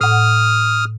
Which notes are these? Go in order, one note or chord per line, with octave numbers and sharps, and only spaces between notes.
A2 F#5 D#6 F6